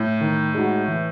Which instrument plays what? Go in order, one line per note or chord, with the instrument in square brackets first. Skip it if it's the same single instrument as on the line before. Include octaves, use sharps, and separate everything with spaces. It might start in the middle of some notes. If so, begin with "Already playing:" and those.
Already playing: [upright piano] A2
[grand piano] D#3
G#3 D#4 F#4
E3